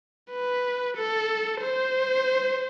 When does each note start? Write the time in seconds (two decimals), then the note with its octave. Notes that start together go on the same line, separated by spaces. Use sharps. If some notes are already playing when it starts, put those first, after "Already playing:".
0.31 B4
0.96 A4
1.61 C5